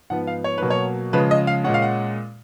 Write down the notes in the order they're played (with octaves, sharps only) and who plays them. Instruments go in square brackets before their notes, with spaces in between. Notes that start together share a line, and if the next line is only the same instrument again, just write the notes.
[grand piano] G#2 F3 B3 F#5
F5
C#5
B2 F#3 A#3 B4
C#5
C#3 F3 G#3 B4
D#5
F5
A#2 G#3 C#4 F#5
F5
F#5